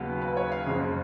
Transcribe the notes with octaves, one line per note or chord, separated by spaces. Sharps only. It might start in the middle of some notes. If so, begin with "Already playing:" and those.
Already playing: D#2 C#3 F#3 B3 B4
B4
C#5
F5
F#1 F2 C#3